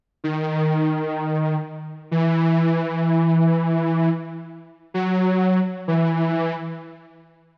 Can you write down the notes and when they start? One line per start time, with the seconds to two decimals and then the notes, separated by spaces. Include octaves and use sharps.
0.24 D#3
2.11 E3
4.94 F#3
5.88 E3